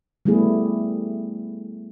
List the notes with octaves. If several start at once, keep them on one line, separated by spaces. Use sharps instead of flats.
G3 A3 B3 E4 G#4